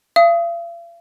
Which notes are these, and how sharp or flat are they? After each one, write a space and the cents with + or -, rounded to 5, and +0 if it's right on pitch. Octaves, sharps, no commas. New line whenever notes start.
F5 -45 D#6 +20